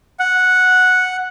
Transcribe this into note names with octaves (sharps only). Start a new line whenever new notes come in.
F#5